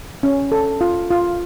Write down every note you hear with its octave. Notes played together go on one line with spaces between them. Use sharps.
C#4
A4
F4
F4